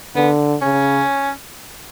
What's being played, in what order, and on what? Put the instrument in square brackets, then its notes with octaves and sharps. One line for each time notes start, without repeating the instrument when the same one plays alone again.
[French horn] D3 [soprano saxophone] B3
[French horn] C#3 [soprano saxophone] C#4